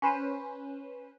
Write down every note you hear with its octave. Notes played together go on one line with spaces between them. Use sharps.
C#4 B4 C5